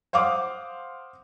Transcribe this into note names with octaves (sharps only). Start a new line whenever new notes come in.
C5 F5 F#5 D6 D#6